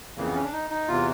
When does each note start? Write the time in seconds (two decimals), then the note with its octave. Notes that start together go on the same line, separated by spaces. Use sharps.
0.17 F2 C#3 E3 A#3
0.26 B3
0.35 C#4
0.44 D4
0.53 D#4
0.70 D#4
0.88 E2 C3 E3 F4